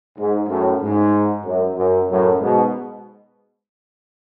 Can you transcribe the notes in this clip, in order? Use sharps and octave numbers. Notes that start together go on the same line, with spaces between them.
G#2
F#2 A2
G#2
F#2
F#2
F#2 A2
G#2 B2